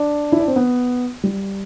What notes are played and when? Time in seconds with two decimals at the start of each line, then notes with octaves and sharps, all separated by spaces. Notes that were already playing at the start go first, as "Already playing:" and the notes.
Already playing: D4
0.32 E4
0.40 D4
0.48 C4
0.56 B3
1.24 G3